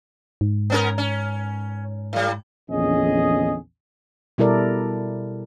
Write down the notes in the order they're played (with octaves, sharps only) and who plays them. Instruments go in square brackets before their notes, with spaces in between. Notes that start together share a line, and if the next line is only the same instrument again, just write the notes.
[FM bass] G#2
[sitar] B3 C#4 A#4
C#4
A2 G3
[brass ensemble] A#1 E2 D3 C#4 G#4 D#5
[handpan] B2 G3 E4 A4 A#4 D5